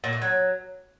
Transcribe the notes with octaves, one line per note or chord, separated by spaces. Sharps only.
A#2
A3
F#3